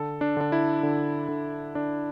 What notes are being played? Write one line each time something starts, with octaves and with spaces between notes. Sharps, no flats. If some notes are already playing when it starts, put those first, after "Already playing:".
Already playing: D3 A4
D4
D3 D4
E4
D3
D3
D3 D4